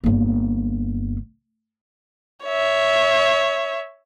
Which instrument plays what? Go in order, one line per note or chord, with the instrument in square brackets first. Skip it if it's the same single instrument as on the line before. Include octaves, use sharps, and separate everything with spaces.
[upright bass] G1 A#3
[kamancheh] C#5 E5